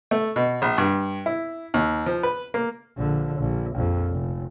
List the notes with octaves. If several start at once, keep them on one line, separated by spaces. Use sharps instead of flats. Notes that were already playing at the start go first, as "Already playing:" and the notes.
A3
B2
A#1
G2
E4
D#2
F3
B4
A#3
A#1 D3
A#1
A#1 F2
F1